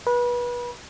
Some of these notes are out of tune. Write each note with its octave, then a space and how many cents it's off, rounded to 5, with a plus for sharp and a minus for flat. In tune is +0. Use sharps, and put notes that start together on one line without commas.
B4 -30